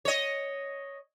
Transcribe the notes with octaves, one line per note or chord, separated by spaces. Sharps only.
C#5 D#5